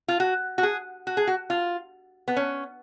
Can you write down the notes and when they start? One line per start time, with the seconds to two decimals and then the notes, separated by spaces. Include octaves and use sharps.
0.08 F4
0.20 F#4
0.58 F#4
0.63 G#4
1.07 F#4
1.17 G#4
1.27 F#4
1.50 F4
2.28 B3
2.36 C#4